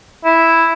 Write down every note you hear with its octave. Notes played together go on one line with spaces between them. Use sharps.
E4